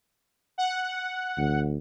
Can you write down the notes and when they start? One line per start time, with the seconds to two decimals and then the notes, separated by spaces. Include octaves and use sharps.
0.58 F#5
1.37 D2